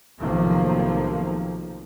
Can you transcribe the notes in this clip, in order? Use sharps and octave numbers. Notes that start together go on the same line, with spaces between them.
B1 A2 C3 D#3 F3 A#3